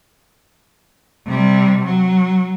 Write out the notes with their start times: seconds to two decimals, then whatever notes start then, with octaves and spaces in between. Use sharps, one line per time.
1.28 C3 G3
1.84 F#3